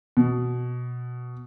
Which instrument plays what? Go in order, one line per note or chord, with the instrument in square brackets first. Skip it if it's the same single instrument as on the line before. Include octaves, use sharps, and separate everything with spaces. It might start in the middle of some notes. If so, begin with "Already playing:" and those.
[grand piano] B2